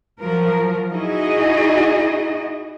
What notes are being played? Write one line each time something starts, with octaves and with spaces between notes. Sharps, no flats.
F3 F#3 A#4
D#4 E4 F#4 G#4 D#5